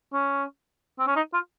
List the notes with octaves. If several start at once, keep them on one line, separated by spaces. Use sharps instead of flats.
C#4
C4
C#4
D#4
F4